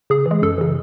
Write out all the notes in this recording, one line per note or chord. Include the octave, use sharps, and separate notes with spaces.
C#3 G#4
E3
G#3
F#2 A4
C#3 E3